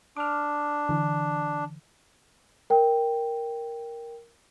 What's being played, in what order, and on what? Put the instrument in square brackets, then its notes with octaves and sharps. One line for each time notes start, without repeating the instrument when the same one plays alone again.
[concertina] D4 [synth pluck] D6 F6
[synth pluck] D3 E3
[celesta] A#4 G5